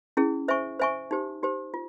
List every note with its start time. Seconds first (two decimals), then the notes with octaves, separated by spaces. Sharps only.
0.17 C#4 E4 G#4
0.48 C5 E5 G#5 C#6
0.80 C5 E5 G#5 C#6
1.11 D#4 G4 C5
1.43 D#4 G4 C5
1.74 F4